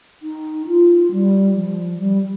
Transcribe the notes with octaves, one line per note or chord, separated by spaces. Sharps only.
D#4
F4
G3
F3
G3